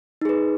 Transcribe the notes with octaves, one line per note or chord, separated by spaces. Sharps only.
D#4 G#4 B4